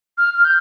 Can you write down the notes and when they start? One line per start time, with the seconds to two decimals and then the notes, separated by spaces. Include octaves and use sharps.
0.18 F6
0.35 F6
0.45 G6